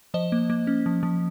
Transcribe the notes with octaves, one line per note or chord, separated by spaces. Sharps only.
F3 C5 D#5
A#3
A#3
C#4
F3
F3